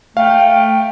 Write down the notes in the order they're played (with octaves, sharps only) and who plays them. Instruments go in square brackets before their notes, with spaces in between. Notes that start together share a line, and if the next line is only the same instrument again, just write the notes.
[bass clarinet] A3 [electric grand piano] F5 [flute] G5